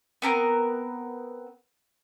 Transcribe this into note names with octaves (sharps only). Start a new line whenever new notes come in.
B3 C4 A#4